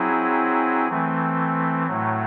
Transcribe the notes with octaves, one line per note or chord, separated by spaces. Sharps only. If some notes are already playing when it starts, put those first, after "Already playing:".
Already playing: F#3 C4 E4 G#4
E3 A3 C4
A2 F#3 A3